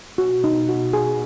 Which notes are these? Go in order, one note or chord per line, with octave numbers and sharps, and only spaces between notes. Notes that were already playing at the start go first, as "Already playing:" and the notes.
B2 F#4
D#4
F#4
G#4